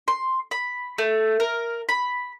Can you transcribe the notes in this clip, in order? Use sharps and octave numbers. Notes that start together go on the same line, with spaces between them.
C6
B5
A3
A#4
B5